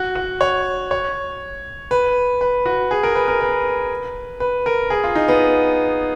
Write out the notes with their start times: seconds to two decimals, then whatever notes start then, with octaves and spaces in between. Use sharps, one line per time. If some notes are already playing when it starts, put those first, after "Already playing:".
Already playing: F#4
0.15 F#4
0.41 C#5
0.91 C#5
1.91 B4
2.41 B4
2.66 F#4
2.91 G#4
3.03 A#4
3.15 B4
3.28 A#4
3.41 B4
4.40 B4
4.66 A#4
4.90 G#4
5.04 F4
5.15 D#4
5.28 B3